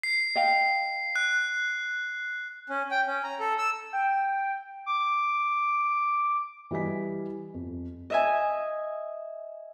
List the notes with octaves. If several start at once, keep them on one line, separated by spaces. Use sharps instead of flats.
C7
D#5 F5 G5
F#6
C#4
G5
C#4
A#5
A4
E6
G5
D6
E3 G3 D#5 G#5 B6
F2
D#5 E5 G#5